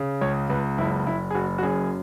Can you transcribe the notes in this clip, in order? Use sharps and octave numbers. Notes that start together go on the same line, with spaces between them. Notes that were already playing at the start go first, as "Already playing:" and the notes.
Already playing: C#3
C#2 C#5
C#2 B4
F#1 E4
F#1 E4
G#4
F#1 F#4
F#4
F#2 G#4